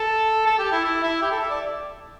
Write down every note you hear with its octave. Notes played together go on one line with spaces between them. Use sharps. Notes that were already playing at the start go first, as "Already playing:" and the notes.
Already playing: A4
A4
G4
E4
E4
E4
G4
A4
E5
D5